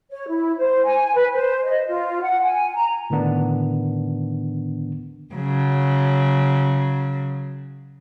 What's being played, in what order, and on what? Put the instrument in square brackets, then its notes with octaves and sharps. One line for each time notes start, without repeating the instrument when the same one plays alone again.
[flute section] C#5
E4
C5
G#5
B4
C5
D#5
F4
F#5
G#5
A#5
[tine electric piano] A2 D3 D#3 B3 D4
[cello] C#3 F#3